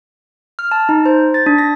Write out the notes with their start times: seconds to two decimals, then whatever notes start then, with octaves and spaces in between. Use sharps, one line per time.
0.59 F6
0.71 A5
0.89 D#4
1.06 C5
1.34 A6
1.46 D4
1.58 A#6